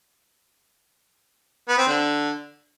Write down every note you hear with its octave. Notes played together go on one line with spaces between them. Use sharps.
B3
C4
D3